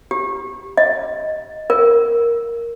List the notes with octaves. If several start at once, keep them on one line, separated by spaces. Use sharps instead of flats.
G4
D#5
A#4